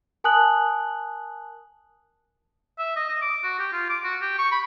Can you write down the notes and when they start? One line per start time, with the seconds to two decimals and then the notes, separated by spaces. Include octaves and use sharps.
0.24 A#4 G#5 A5 D#6 F#6 F#7
2.79 E5
2.96 D#5
3.09 D#5
3.22 D6
3.43 F#4
3.59 G4
3.73 F4
3.89 D6
4.04 F#4
4.21 G4
4.38 C#6
4.51 B5